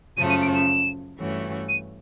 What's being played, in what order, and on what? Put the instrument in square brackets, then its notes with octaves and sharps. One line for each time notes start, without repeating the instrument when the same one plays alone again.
[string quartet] F#2 C#3 F3 A3 C#4 [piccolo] D#7
[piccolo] D#7
D7
E7
[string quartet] G2 E3 A3 C#4 F#4
[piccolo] D#7